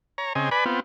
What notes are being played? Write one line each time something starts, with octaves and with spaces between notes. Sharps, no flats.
C#5 A#5
C#3 C4 D#5 G#5
B4 D5 G#5 B5
B3 C4 F4